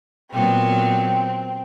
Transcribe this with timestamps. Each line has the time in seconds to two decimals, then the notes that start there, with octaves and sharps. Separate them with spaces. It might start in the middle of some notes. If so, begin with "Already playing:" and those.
0.32 A#2 F#3 B3 C4